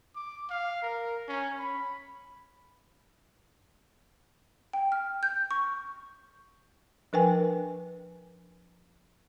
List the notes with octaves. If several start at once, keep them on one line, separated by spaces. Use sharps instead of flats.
D6
F5
A#4
C#4
B5
G5
F6
G6
C#6
F3 D4 A#4 B4 G5 G#5